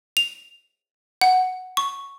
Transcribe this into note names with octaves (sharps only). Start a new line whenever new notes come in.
F7
F#5
C#6